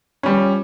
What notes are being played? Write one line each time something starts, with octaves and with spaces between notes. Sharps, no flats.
F3 G3 C#4